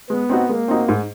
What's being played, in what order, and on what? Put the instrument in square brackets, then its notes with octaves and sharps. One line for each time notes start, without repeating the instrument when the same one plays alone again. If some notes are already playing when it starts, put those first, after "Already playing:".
[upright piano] G#3 [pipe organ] B3
[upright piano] C4 D#4 F#4
[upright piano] G#3 [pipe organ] A#3
[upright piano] C4 D#4 F#4
G#2